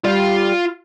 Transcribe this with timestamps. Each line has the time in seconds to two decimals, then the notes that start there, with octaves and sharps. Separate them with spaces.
0.04 G3 F4 F5